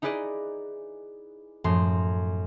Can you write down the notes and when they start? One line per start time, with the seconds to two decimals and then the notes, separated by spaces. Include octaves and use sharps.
0.02 D#4 E4 G#4 B4 D5 D#5
1.64 F#2 A2 F3 A3 C6